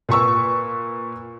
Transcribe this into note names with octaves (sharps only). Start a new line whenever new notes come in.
A#2 B4 C#6 E6